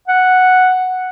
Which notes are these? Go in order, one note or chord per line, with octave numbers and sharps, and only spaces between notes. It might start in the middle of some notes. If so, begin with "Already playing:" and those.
F#5